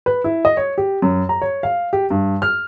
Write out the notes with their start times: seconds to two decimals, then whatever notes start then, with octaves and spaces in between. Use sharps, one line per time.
0.06 B4
0.24 E4
0.45 D#5
0.57 C#5
0.78 G4
1.02 F#2
1.29 A#5
1.42 C#5
1.63 F5
1.93 G4
2.10 G2
2.42 F6